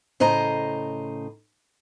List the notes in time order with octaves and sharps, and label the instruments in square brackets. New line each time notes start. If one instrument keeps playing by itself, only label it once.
[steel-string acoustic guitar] A2 C#3 C5 D#5 A#5